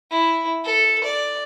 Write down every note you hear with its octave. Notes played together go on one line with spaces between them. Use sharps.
E4
A4
D5